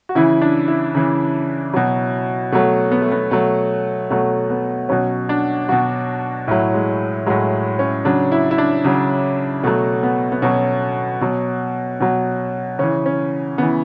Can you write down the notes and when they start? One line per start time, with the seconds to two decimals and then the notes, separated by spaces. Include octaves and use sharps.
0.09 F#4
0.15 C#3 E3 E4
0.41 D4
0.68 E4
0.95 C#3 E3
1.74 B2 F#3
2.52 B2 F#3 A3
2.92 B3
3.02 A3
3.12 B3
3.31 B2 F#3 A3
4.10 B2 F#3 A3
4.50 B3
4.89 B2 F#3 C#4
5.29 D4
5.69 B2 F#3 F#4
6.47 A2 F#3 E4
6.74 G#3
7.26 A2 F#3 G#3
7.79 C#4
8.05 C#3 F#3 D4
8.32 E4
8.51 E4
8.58 D4
8.84 C#3 F#3
9.63 B2 F#3 A3
10.03 B3
10.32 B3
10.42 B2 F#3 C#4
11.21 B2 F#3
12.00 B2 F#3
12.79 C#3 E3 C#4
13.06 C#4
13.58 C#3 E3 B3